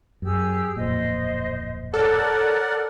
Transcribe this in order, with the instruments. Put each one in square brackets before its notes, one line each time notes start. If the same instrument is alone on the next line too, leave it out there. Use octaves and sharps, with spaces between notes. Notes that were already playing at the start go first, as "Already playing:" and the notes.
[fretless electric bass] F#2 [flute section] G4 G#4 E6
[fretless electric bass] D1 F2 A#2 [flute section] C5 D#5
[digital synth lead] A4 [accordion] A#4 D5 F#5 [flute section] C#5